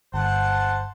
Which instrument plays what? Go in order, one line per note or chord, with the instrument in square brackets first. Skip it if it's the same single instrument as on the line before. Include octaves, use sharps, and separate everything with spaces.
[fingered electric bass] G1 [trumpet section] C5 F#5 A5